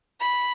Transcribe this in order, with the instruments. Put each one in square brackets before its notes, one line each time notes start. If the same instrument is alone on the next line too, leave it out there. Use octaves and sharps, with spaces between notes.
[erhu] B5